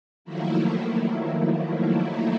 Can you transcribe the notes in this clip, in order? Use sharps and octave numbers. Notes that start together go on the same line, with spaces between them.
D#3 F3 F#3 A3 A#3 E4